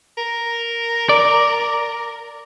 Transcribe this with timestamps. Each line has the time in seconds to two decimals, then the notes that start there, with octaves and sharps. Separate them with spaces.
0.18 A#4
1.09 D5